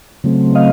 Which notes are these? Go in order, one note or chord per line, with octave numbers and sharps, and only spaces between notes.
C#3 F#3 A3 C4
D#5 F5